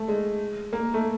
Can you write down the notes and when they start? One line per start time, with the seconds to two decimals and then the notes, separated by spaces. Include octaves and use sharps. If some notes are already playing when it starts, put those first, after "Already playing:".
Already playing: A3
0.08 G#3
0.73 A#3
0.94 A3